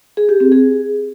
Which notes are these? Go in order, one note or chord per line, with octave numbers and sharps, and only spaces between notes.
G#4
G4
C4
G#4